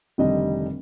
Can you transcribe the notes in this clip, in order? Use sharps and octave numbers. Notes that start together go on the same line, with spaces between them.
F1 D3 D#3 G3 D4 D#5